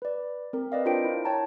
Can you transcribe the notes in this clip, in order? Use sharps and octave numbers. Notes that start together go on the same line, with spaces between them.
B4 D5
C4 A#4
B4 D5 D#5 F5
D4 F4 A#4 C5 G5 D7
E4
C#5 G5 A5 A#5